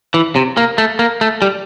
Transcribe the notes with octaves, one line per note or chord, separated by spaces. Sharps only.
E3
C3
A#3
A3
A#3
A3
G3